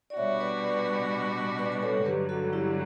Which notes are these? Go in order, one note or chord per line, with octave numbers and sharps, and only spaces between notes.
D5
B2 G3 D4 F#4 C#5 E5
B4 D5
B4 D5
B4
A4 C#5
G2 D3 F#3 G4 B4
F#4 A4
E4 G4